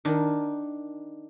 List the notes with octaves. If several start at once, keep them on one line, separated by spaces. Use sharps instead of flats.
D#3 D4